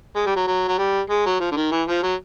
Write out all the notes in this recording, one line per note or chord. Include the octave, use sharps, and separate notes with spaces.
G#3
G3
F#3
F#3
F#3
G3
G#3
F#3
F3
D3
D#3
E3
F3
F#3